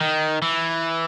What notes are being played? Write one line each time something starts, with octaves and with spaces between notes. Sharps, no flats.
D#3
E3